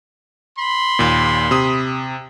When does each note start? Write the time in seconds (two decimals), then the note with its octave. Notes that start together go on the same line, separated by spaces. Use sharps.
0.59 B5 C6
0.99 D#2 A#2
1.51 C3 D#6